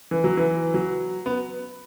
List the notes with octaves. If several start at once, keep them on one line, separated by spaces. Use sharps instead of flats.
E3
F#3
E3
F#3
B3